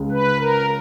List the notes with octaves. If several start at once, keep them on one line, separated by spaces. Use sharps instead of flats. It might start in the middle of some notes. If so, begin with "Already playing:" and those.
Already playing: C#2 C#3 G#3 C#4 G#4
B4
A#4